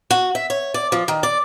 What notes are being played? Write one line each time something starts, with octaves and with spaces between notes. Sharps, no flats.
F#4
E5
C#5
D5
F3
D#3
D5